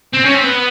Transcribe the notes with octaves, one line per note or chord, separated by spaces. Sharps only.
C4
C#4
C4
B3